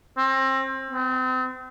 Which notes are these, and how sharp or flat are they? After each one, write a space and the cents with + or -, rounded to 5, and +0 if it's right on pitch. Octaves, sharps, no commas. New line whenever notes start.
C4 +30
C4 -35